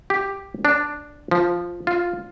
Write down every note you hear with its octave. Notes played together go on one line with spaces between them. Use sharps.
G4
D4
F3
F4